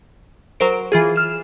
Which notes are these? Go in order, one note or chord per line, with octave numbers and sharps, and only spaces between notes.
F#3 A#4 C5 D7
E3 F4 G#4
F6 E7